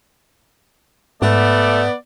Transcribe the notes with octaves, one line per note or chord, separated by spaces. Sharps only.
G#2 A3 B3 D5